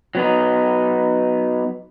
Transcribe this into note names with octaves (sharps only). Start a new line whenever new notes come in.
F#3 B3 D#4